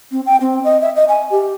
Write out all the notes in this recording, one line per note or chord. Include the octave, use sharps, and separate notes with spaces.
C4
G5
C4
D#5
E5
D#5
G#5
G4